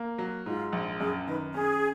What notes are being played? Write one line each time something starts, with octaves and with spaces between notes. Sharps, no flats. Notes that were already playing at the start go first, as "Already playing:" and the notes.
Already playing: A#3
F#3
G#2 F4
A#1
F#2 G#4
D#3 B4
C#4 G#4